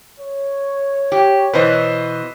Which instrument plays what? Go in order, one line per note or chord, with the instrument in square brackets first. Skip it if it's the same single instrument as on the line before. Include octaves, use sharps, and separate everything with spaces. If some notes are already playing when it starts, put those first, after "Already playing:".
[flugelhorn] C#5
[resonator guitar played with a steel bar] G4
[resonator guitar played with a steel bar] B2 E3 [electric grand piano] B4 C5 D#5